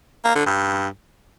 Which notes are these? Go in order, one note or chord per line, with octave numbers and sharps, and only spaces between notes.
A#3
D3
G2